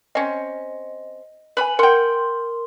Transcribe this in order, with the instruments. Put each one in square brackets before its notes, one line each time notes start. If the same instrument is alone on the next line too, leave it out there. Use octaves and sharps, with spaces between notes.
[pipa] C4 C#4 [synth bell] D#5
[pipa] B4 B5 [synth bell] G#5 F#7
[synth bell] A#4 C6 [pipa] F#5 G5